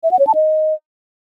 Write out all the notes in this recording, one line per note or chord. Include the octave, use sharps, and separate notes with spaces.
E5
F#5
C#5
A5
D#5